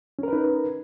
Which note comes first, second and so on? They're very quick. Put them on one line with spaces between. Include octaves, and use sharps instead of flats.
C#4 A#4 B4 D#4